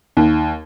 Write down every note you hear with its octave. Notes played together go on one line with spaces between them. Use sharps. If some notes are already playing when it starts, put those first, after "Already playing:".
D#2